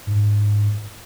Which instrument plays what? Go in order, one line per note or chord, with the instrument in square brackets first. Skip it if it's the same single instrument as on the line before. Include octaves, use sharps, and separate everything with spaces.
[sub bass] G#2